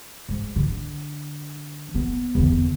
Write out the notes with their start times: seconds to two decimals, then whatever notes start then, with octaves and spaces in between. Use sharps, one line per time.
0.29 G#2
0.56 D3
1.95 B3
2.35 E2 D3